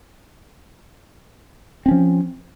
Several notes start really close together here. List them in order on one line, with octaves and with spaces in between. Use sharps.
C4 C#4 F3